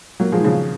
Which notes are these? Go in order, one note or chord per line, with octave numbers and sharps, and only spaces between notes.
F#3 A#3
F3 G#3
D#3
C#3 F3